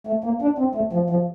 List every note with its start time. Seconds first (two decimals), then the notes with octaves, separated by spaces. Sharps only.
0.07 A3
0.24 A#3
0.42 D4
0.58 C4
0.75 A3
0.93 F3
1.10 F3